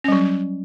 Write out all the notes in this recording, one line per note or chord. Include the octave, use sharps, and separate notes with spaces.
F#3 G3 C#4